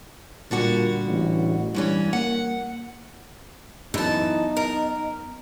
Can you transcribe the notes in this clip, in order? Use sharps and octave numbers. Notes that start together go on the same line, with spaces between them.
A#2 D3 G3 F#4
A1
G2 E3 G3 C#4
A#3 F#5
F#2 E3 B3 D#4 A5
A#4